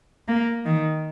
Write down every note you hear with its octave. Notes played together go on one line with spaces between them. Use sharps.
A#3
D#3